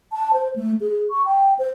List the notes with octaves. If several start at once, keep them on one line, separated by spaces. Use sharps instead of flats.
A5
C5
A3
G#4
C#6
G5
C5